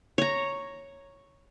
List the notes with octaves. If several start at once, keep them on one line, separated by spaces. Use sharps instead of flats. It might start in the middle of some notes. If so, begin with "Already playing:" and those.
C#5 A#5